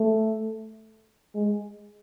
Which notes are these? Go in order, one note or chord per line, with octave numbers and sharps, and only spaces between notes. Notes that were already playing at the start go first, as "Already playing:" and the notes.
Already playing: A3
G#3